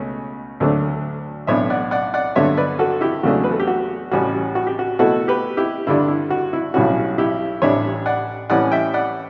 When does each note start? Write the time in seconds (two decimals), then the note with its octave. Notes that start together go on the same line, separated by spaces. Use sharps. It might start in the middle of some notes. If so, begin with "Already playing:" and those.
Already playing: C#2 B2 A3 C#4
0.60 D2 D3 F#3 A3 D4
1.47 B1 A2 E3 B3 D4 C#5 E5
1.70 D5 F#5
1.91 D5 F#5
2.14 D5 F#5
2.36 G2 D3 F#3 B3 C#5 E5
2.57 B4 D5
2.79 F#4 A4
3.01 E4 G4
3.23 E2 C#3 F#3 A3 D4 F#4
3.44 B4
3.52 A4
3.60 G4
3.67 F#4
4.11 A1 A2 G3 C#4 F#4
4.55 F#4
4.67 G4
4.79 F#4
4.99 B2 A3 E4 F#4 A4
5.28 G4 B4
5.57 E4 G4
5.87 G2 D3 G3 D4 E4
6.08 E4
6.30 F#4
6.53 E4
6.74 B1 A2 G3 C#4 E4 F#4
7.18 E4 G4
7.62 A1 A2 G3 D4 C#5 E5
8.06 D5 F#5
8.50 A2 E3 G3 C#4 D5 F#5
8.72 E5 G5
8.94 D5 F#5